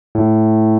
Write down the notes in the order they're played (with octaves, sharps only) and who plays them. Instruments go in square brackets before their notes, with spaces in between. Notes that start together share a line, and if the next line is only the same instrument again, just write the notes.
[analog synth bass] A2